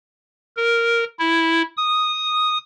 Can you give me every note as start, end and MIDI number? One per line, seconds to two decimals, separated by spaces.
0.57 1.04 70
1.19 1.62 64
1.77 2.58 87